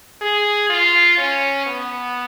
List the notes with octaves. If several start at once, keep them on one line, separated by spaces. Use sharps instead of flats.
G#4
F4
C#4
B3